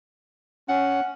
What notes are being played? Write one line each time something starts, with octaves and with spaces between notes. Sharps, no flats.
C#4 F#5